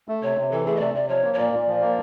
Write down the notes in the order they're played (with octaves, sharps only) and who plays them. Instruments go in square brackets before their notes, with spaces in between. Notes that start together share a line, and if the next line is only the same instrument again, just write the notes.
[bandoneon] A3
[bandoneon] C3 [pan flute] C#5
[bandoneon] C3
[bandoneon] E3 [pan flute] A4
[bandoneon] A3 [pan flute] G#4
[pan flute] D#5
[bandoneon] C3 [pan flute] D5
[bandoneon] C3 [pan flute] D5
[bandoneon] F3 [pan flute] C#5
[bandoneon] A#3
[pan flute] C#5
[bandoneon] A#2 [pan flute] D5
[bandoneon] A#2
F3
A#3